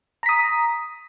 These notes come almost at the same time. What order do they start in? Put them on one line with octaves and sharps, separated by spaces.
A#5 B6 D#6